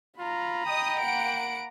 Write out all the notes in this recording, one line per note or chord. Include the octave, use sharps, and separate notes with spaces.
F4 A#5 B5
D#5 G5 D#6
A#3 F#5 D7